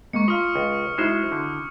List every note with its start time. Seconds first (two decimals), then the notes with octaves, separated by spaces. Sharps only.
0.13 G#3 A#3 C#6 C#7
0.28 F4 F5 C6 D#6 F6
0.56 C#2
0.98 G#3 D#4 E4 F#4 C5 E5
1.32 D3